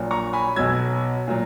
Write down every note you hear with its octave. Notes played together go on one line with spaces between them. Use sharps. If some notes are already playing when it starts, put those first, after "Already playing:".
Already playing: A#1 A#2 F#3
A#5 C#6
G#5 B5
B1 B2 F#3 E6 G#6
A#2 F#3